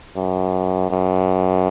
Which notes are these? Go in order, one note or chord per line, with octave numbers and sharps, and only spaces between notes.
F#2
F#2